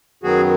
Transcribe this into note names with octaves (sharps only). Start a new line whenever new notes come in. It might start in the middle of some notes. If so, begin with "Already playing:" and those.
F#2 D#3 F#3 B3 F#4 G#4